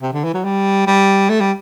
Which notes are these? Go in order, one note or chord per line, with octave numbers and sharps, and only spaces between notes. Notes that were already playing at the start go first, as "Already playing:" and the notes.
C3
D3
E3
F#3
G3
G3
A3
G3